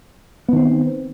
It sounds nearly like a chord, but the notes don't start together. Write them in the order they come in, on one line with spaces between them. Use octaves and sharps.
B3 D#3 C4